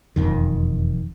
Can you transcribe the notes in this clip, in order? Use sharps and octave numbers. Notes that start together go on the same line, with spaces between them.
E1 A1 F2 D#3